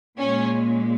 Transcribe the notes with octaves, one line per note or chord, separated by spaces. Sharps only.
A#2 G#3 C#4